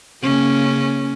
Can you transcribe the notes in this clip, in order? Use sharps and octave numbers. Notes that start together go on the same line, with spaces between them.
C#3 A#3 C#4